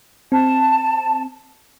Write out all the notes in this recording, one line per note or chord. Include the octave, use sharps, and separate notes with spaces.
C4 A5